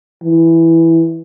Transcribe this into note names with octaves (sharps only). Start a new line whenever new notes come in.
E3